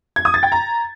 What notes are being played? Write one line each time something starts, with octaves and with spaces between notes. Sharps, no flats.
G#6
D#6
A6
G5
A#5